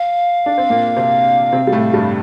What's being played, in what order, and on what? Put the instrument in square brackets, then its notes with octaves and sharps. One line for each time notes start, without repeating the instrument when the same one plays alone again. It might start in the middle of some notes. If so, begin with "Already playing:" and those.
Already playing: [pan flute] F5
[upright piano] D4
C4
A#2 A#3
C3 C4
C3 C4
G3
A2 A3
G2 G3